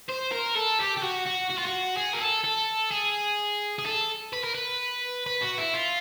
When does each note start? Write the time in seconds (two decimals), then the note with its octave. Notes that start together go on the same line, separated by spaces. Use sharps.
0.09 C5
0.32 A#4
0.56 A4
0.79 G4
0.98 G4
1.03 F#4
1.27 F#4
1.51 F#4
1.59 F4
1.67 F#4
1.98 G#4
2.14 A#4
2.21 A4
2.44 A4
2.92 G#4
3.79 G#4
3.86 A4
4.33 B4
4.44 A#4
4.55 B4
5.27 B4
5.42 F#4
5.58 E4
5.74 F4